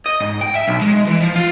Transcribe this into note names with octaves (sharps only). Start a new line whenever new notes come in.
D#5
G#2
G5
E5
B1
G#3
E3
F3
F4